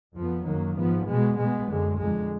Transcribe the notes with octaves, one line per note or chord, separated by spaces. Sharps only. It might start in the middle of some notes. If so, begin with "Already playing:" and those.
F2 F3 B3
F#2 D#3 F#3 A#3
G#2 F3 B3
B2 G#3 B3
B2 G#3 B3
F#2 D3 G#3
F2 D3 G#3